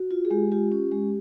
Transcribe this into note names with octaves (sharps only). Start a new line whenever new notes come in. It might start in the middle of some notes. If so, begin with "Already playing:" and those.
Already playing: F#4
F4
G#4
G#3 G4
F4 G4
C#4
G#3